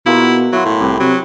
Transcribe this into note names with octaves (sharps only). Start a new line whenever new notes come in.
B2 A#3 E4 F4 G#4
F#4
F#3 E4 F#4 C6
A2
C2 G4 B4
C3 F#3